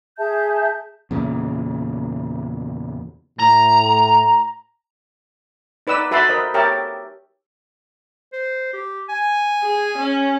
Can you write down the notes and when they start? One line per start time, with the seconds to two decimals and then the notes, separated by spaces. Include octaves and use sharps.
0.18 G#4 E5 A5 G6
1.11 E2 A#2 C#3
3.39 A2 A#5
5.87 D#4 B4 D5 E6
6.11 F#4 B4 E5 A5 B5 C6
6.29 A#4 C5 D#5
6.54 G4 A#4 C#5 E5 G5 A5
8.33 C5
8.73 G4
9.09 G#5
9.63 G#4
9.98 C#4